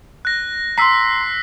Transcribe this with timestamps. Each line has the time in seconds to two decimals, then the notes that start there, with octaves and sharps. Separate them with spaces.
0.25 F#6 A#6
0.78 A#5 C6 E6 B6 C7